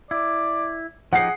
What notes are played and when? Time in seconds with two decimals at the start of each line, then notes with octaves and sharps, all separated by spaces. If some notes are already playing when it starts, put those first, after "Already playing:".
0.11 E4 D5
1.13 F3 D#4 G4 G#4 F#5 C7